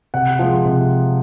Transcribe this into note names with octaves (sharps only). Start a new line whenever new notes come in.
C3 F#5
F3 G#3
C3